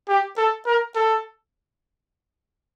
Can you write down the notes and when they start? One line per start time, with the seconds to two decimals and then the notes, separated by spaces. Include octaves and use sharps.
0.08 G4
0.37 A4
0.66 A#4
0.95 A4